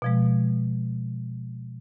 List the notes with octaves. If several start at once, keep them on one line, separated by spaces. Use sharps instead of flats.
B2 F3 G#3